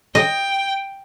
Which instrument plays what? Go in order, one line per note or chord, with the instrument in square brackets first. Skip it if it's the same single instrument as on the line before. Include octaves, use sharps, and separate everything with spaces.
[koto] D#5 [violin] G5